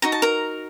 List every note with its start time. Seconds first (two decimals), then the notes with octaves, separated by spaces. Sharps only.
0.02 D#4 F#4 A#5
0.12 A5
0.22 A#4 A#5